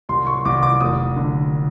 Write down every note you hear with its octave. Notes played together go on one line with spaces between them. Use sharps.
C2 C6
C#6
C2 D6
D6
F1 D#6
D3